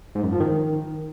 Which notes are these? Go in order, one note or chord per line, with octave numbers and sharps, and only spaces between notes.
G#2
F#2
F3
D#3